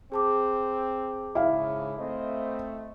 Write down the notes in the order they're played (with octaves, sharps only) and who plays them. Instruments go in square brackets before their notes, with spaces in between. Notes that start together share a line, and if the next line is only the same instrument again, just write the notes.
[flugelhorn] C4 [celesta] G#4 A5 D6
[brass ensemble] G#2 C#3 [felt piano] E4 F5
[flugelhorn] A3 [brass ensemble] C4 C5 D#5